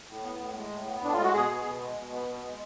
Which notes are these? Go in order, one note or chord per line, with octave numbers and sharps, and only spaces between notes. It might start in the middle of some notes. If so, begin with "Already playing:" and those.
A2
B3
A2
G#3
A2
B3
A2 D4
G#3 F4
F#4
B2 G#4
B3
B2
G#3
B2
B3
B2
G#3